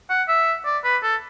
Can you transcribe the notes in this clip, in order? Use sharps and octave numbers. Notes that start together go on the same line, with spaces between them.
F#5
E5
D5
B4
A4